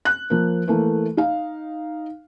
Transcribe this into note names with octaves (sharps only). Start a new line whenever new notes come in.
F#6
F3 A#3
E3 A3 A#3
D#4 F5